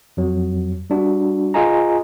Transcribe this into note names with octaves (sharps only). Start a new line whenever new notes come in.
F2 F#3
G3 D4 F#4
F4 G#4 D#5 G#5 A#5